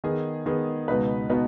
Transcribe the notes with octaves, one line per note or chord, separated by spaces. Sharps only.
D#3 B3 G#4
D#3 B3 G#4
C#2 B2 B3 D#4 B4
B2 B3 D#4 B4